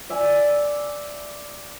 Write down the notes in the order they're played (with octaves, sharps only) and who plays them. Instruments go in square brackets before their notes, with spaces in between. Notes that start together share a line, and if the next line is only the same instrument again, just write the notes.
[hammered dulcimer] D5 E5 G#5